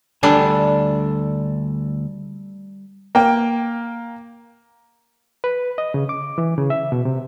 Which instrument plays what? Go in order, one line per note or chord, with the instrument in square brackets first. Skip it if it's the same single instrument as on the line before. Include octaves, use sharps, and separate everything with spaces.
[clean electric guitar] D2 A4 G#5 [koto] G3 D4
[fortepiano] A#3 G5
[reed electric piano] B4
D#5
C#3
D6
E3
C#3
E5
B2
C3